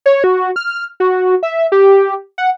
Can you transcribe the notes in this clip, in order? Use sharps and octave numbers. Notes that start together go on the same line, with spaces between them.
C#5
F#4
F6
F#4
E5
G4
F#5